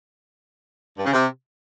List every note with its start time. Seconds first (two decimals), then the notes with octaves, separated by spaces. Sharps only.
0.97 G2
1.05 C#3
1.13 C3